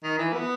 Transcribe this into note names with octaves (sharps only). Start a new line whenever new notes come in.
D#3
E3
B3